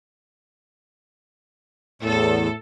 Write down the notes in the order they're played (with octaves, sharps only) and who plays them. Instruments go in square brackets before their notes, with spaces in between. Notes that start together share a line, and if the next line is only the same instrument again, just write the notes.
[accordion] E2 [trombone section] A2 [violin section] A4